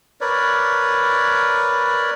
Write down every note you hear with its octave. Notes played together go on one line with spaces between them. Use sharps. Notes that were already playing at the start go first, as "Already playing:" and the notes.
A#4 B4 C#5 D5